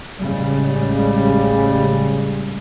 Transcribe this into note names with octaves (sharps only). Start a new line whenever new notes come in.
A1 C#3 G3 G#3